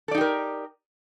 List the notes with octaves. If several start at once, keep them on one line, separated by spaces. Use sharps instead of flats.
D#4 G4 A4 A#4 D5